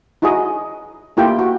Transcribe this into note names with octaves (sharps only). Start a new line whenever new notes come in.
D#4 E4 F#4 G#4 D#5
A3 A#3 E4 F4 G4 G5
F#4